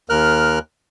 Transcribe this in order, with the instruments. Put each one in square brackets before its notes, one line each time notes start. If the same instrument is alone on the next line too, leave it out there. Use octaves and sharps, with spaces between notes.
[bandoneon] D#2 A#4 F6 F#6